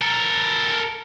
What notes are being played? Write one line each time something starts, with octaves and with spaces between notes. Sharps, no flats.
A4 A#4